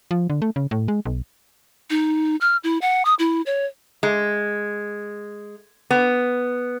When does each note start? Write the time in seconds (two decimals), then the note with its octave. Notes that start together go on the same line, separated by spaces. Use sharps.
0.11 F3
0.30 D3
0.42 A3
0.56 C#3
0.71 A2
0.88 G#3
1.05 B1
1.90 D#4
2.41 F6
2.64 E4
2.81 F#5
3.05 D#6
3.19 E4
3.46 C#5
4.03 G#3
5.90 B3